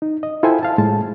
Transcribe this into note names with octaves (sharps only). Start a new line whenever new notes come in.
D#4
D#5
E4 F4 A4 C5 G5 G#5
F5 A5
A2 G#3 A5